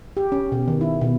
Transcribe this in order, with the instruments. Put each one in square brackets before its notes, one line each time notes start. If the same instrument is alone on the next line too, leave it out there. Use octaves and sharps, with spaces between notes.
[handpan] G4
C#4
B2
D#3
E4
B2